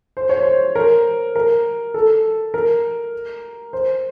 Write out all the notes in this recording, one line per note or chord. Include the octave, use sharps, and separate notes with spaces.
C5
C#5
C5
A#4
A#4
A4
A#4
C5